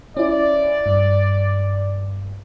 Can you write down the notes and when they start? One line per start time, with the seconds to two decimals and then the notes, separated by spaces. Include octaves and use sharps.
0.17 C#4 E4 D5
0.86 G2